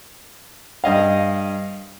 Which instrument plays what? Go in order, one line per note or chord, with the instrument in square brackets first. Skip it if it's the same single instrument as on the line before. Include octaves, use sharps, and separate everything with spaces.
[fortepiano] G2 D#5 F5